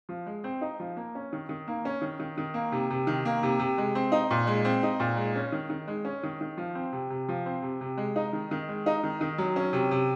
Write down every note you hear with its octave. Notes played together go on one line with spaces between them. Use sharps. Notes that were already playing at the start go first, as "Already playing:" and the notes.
F3
G#3
C4
D#4
F3
A#3
C#4
D#3
D#3
A#3
C#4
D#3
D#3
D#3
A#3
C3
C3
D#3
A#3
C3
C3
G#3
C4
D#4
A#2
G#3
C4
D#4
A#2
G#3
C#4
D#3
D#3
G#3
C#4
D#3
D#3
F3
C4
C3
C3
F3
C4
C3
C3
G#3
D#4
D#3
D#3
G#3
D#4
D#3
D#3
F#3
C#4
C3
C3